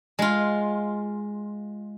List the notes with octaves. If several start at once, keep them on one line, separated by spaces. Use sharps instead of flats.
G#3 F4